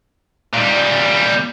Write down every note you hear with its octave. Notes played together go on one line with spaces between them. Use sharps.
A#2 G3